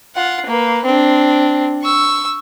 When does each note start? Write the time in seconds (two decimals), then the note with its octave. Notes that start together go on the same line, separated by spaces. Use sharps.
0.15 F4 F#5
0.46 A#3 B4
0.85 C4 D4
1.83 C#6 E6